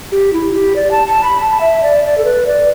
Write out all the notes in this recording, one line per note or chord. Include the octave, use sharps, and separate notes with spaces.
G4
E4
G4
D5
A5
A5
B5
A5
E5
D5
D5
A4
B4
D5